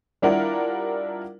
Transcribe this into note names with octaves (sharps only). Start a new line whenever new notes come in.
G3 D4 E4 F4 A#4 F#5